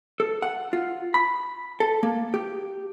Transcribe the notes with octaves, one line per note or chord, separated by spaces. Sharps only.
A4
F#5
F4
B5
A4
A#3
G4